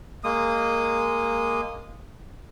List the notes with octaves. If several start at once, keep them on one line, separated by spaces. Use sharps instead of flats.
G#3 A#3 D#6